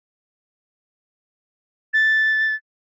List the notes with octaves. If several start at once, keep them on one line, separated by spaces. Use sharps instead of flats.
A6